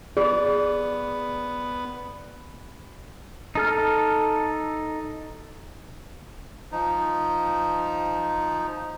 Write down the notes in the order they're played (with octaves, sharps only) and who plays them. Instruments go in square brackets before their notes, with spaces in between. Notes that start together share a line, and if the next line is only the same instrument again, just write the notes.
[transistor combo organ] B3 [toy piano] G#4 [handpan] D5
[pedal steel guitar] D#4 A4 F6
[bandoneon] F3 D#4